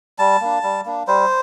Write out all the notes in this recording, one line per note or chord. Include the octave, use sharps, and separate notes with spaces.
G3 A5
A#3 D4
G3
A#3 D4
G3 C5